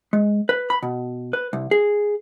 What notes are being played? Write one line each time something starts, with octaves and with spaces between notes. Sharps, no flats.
G#3
B4
B5
B2
B4
C2
G#4